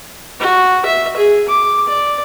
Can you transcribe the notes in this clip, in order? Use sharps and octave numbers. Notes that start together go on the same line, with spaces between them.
F#4
E5
G#4
D6
D5